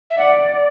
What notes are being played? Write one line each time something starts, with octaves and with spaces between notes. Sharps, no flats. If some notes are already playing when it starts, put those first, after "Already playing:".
E5
D5 F#5